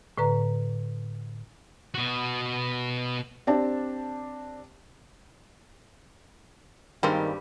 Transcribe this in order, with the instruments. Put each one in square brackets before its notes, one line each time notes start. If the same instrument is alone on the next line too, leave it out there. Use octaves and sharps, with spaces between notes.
[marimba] A2 D3 B4 A#5
[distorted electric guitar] B2 F#4
[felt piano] C4 D4 G4 A5
[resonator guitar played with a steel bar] G2 G3 [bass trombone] D#3 [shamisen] G#3 A#3 C4